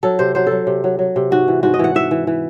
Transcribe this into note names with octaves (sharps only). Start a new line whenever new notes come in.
F#3 A4
C3 C5
F#3 C5
F#3 A4
C3
F#3
F#3
C3
G#2 F#4
E3
G#2 F#4
D#5
E3 F#5
E3 E5
E3
E3